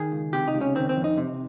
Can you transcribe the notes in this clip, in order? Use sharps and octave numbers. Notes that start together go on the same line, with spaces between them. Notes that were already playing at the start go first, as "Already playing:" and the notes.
Already playing: D#3 G#4
C#2
C3 G4
D#4
C#2
C#4
D#3 C4
C4
F2
D#4
C3